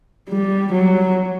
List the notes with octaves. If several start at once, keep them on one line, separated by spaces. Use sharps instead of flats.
G3
F#3